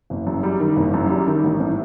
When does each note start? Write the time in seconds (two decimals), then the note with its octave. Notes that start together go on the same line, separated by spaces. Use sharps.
0.10 F#1
0.27 F#2
0.43 G3
0.60 D#3
0.76 F#1
0.94 F#2
1.10 G3
1.27 D#3
1.44 A1
1.60 A2